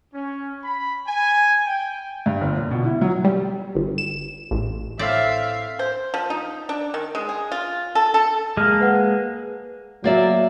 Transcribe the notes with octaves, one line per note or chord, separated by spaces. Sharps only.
C#4
B5
G#5
G5
G2
G1
A#2
B2
E4
F#3
G3
G1
E7
A1
A2 C4 D5 E5 F5
C5
F3
D#4
D4
D#3
G#3
G#4
F4
A4
A4
G#3 A#3 F6
B4 F#5
F#3 A#3 D5 E5